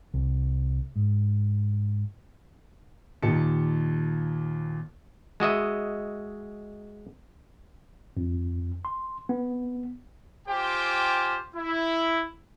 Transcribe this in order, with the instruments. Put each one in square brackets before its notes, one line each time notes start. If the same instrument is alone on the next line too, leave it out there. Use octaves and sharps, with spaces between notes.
[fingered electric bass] C2
G#2
[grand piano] D#2 A#2 D#4 G4 A5 C#7
[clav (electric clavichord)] G#3 F#4 D#5 E5
[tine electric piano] F2
C6
B3
[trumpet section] F4 G4 C5 G5 G#5 D6
E4